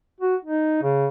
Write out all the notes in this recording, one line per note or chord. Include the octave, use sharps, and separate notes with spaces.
F#4
D#4
C#3